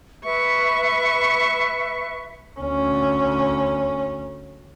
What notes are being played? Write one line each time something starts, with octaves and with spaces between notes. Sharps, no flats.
B4 E5 C#6
D2 C#4